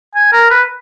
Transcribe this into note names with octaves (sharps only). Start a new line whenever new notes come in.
G#5
A#4
B4